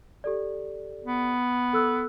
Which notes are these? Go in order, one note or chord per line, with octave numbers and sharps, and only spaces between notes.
G4 A4 D5
B3
A4 E6 F#6